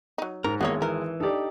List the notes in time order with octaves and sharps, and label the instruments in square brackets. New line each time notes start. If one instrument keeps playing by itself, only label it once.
[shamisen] F#3 D#4
[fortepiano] G#2 [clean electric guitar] A#4
[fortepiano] G#1 G#3 D#6 [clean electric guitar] A#3 [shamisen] B3 E4 C#5
[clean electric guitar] E3 [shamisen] A#4
[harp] D#4 G4 [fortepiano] A4 D5